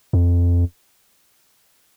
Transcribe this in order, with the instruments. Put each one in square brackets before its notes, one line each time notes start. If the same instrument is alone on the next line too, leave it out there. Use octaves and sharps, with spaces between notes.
[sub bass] F2